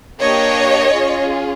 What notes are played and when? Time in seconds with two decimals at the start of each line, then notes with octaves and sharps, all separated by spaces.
0.21 A#3 D4 G4 C#5 D#5
0.93 C#4 F4 G#4